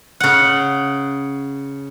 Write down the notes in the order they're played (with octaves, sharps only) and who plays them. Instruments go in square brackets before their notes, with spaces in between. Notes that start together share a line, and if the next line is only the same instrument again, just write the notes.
[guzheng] C#3 F#5